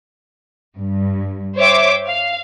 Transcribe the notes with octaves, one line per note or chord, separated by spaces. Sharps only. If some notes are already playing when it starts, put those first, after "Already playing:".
G2
C5 C#5 E5 G5 D6
F5